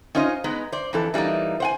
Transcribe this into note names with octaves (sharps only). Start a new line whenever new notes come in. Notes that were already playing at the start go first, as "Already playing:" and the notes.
C#4 D#4 F4 C5 D#5
G#3 B3 D#4
C5 D5
F2 E3 A4
E3 G3 A3 A#3 D#4
C5 F#5 G#5